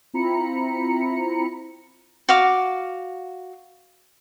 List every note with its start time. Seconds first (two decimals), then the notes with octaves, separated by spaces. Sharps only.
0.14 C4 E4 F4 A#5 B5 C#7
2.29 F#4 F5 D6